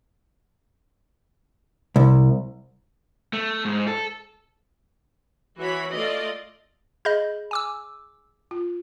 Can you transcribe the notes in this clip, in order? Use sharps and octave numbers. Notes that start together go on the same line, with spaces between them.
C2
A3
G#2
A4
E3 F#4 C#5 B5
A3 F4 D5 D#5
G#4 D#5 B5 G6
G#5 D6 E6
F4